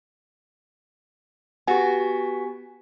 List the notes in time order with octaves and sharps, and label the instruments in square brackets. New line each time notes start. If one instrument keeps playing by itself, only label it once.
[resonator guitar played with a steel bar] B3 F#4 [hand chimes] G4 G#5